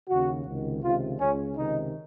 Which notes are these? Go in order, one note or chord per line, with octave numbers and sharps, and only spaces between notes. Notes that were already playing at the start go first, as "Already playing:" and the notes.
D#2 C#3 F#4
C#2 C3 D#3
C#2 C3 D#3 F4
C#2 C#3 C#4
C#2 C3 D#3 D#4